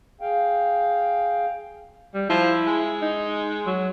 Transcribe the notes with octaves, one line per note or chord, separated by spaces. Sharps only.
G#4 F5 G5
G3
F3 E4
G#3
D#4
F#3